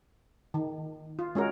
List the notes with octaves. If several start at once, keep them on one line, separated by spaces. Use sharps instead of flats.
D#3
F4
G#3 C#4 F#4 A#4